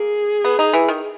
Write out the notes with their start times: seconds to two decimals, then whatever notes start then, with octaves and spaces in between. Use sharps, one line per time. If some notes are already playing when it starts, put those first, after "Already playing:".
Already playing: A#3 G#4
0.45 B3
0.59 D#4
0.73 E3
0.88 D#3